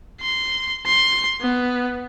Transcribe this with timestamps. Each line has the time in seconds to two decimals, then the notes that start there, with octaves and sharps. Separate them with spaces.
0.21 C6
0.86 C6
1.41 B3